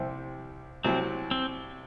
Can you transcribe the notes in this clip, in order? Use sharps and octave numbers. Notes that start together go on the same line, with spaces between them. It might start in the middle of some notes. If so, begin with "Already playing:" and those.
Already playing: C2 C3 G3 C4
C2 C3 F#3 C4
C4